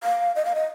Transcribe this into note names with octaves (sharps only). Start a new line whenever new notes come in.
F5
D#5
F5
D#5